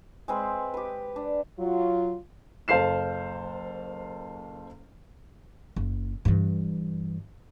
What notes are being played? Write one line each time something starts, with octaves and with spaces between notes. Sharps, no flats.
G#3 C4 B4
G4 B4
D4
F#3 F4
F#1 A4 C5 F5 C7 E7
F#1
G2 E3